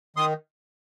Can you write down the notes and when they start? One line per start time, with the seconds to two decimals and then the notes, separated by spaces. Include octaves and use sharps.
0.16 D#3 C6 D#6